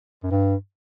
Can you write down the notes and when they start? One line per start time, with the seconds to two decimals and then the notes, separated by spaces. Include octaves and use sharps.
0.23 F#2
0.31 G2